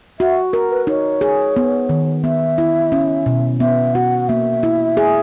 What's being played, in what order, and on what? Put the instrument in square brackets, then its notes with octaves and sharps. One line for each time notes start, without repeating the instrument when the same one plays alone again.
[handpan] F#4 [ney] E5
[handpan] A#4
[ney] B4
[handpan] D#4 [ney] C#5
[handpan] G#4
B3
D#3
[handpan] B3 [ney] E5
[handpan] E4
C#4
B2
[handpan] B3 [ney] E5
[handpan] F#4 [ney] F#5
[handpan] A#3 [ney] E5
[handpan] E4
G#4